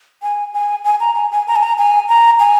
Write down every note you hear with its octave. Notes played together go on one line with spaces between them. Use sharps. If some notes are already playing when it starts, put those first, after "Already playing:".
G#5
G#5
G#5
A#5
G#5
G#5
A#5
G#5
A#5
G#5
A#5
G#5